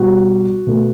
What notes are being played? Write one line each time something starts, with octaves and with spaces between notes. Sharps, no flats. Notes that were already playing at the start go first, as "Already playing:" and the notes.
Already playing: B2 G3 B3 F#4
B2 A3